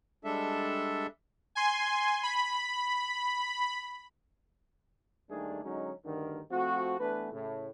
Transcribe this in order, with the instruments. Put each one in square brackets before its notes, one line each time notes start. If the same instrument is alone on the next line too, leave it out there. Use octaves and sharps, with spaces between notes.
[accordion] G3 G#3 D4 A4 E5
[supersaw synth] G#5 C6
B5
[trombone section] D#2 D#3 G3 A3 D4 G#4
D3 F#3 G#3 C#4 D#4
D2 G2 D3 D#3
F3 A3 C4 F#4
E3 A3 B3 D4 B4
A2 C#3